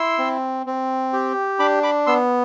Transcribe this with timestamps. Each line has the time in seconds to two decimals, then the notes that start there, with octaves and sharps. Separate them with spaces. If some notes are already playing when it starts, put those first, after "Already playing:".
Already playing: E4 C6 E6
0.18 C4
0.66 C4
1.13 G4
1.59 D4 B5 D6
1.83 B5 D6
2.06 B3 C6 E6